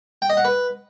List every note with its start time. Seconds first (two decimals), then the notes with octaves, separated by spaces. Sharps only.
0.22 G5
0.30 D#5
0.37 F#5
0.45 B4